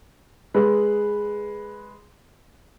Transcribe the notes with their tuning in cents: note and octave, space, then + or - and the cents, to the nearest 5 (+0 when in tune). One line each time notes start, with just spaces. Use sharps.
G#3 +0 B4 -5